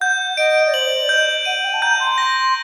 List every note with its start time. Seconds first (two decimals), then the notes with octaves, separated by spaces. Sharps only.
0.01 F#5 G6
0.37 D#5 D7
0.67 D5
0.74 C5 F#7
1.00 D5
1.09 D#5 G6
1.45 F#5 D#7
1.64 G5
1.74 A5
1.82 A#5 G6
2.00 C6
2.18 A#6